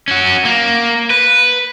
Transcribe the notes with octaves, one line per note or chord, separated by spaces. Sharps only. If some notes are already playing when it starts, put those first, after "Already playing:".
C#4 F#4
A#3
B4